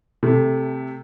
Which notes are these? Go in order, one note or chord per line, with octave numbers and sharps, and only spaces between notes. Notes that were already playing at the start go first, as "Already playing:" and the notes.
C3 A3